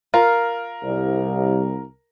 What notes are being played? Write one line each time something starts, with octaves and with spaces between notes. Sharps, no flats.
F4 A#4
C2